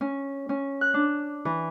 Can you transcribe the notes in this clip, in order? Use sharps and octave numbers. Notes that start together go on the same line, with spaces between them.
C#4
C#4
F#6
D4
E3